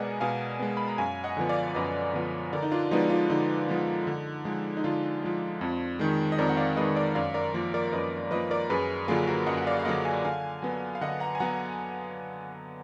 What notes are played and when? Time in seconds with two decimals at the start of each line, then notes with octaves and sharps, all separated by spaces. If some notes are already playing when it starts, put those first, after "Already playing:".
Already playing: B2 G#3 B3 A#4 D5 D#5 F#5 G#5
0.20 B2 F5 G#5
0.59 G#3 B3
0.77 B5
0.88 A#5
0.98 F#2 F5 G#5
1.24 D#5 F#5
1.37 D3 F3 B3
1.49 D5 F5
1.75 F#2 B4 D#5
2.13 D3 F3 B3
2.53 D3 A#4 D5
2.62 D#4
2.72 D4 F4
2.91 F3 G#3 B3 D#4 F#4
3.10 D4 F4
3.30 D3 D#4
3.68 F3 G#3 B3
4.07 D3
4.45 F3 G#3
4.77 D#4
4.84 D3 D4 F4
5.23 F3 G#3
5.61 F2
5.99 D#3 G#3
6.32 D#5
6.38 F2 A#4 D5
6.49 F#5
6.57 D5 F5
6.76 D#3 G#3 B4 D#5
6.96 A#4 D5
7.15 F#2 D5 F5
7.34 A#4 D5
7.54 F3 A#3
7.74 A#4 D5
7.93 F#2 B4 D#5
8.31 F3 A#3 B4 D#5
8.51 A#4 D5
8.70 F#2 G#4 B4
9.08 D3 F#3 A#3 F4 G#4
9.27 F#4 A#4
9.47 F#2 D#5 F#5
9.58 F#5
9.67 D5 F5
9.79 F5
9.85 D3 F#3 A#3 D#5 F#5
10.05 F5 G#5
10.24 D3 F5 G#5
10.62 F#3 B3
10.95 F5
11.01 D3 D#5 F#5
11.20 F#5 A#5
11.35 G#5
11.40 F#3 B3 F#5 A#5